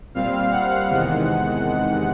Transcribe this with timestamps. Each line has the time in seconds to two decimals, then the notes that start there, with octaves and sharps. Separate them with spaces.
0.14 A#2 G3 C4 F5
0.51 F#5
0.88 E2 C3 D#3 G#3